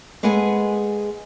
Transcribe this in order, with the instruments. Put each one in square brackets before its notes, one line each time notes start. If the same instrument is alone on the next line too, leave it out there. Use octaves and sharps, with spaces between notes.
[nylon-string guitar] G#3 G#4 A4 B4 F#5 G#5